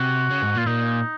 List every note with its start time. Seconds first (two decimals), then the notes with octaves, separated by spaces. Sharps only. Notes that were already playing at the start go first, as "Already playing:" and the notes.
Already playing: C3 F#4
0.30 C#3
0.42 G#2
0.54 A#2
0.59 F4
0.66 A#2 D#4